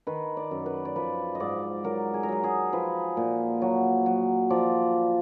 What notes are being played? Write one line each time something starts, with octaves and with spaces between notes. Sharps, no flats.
D#3 B4
D5
F#2
B4
D5
F3 B4
D#5
G#2 D5
F#3 A#4
G#4
A#4
F#3 G#4
G#4
F3 B4
A#2
F#3
F#3
F3 D5